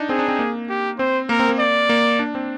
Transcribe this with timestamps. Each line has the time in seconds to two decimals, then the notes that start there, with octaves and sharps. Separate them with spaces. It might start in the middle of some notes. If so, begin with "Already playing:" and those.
Already playing: D4 D#4
0.09 C4 G#4
0.19 D4
0.28 C4
0.39 A#3
0.70 G4
0.99 C4 C5
1.29 A#3 A#4
1.39 C4
1.49 A#3
1.59 D5
1.89 A#3
2.19 D4
2.35 C4